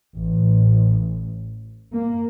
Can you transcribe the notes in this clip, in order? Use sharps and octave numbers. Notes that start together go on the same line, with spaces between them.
A1
A#3